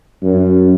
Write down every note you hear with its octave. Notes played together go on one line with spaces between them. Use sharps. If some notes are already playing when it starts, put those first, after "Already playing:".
F#2